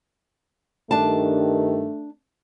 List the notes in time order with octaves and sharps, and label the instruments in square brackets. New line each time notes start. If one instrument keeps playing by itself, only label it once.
[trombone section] G2 D#3 [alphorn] A3 [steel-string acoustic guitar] D4 A5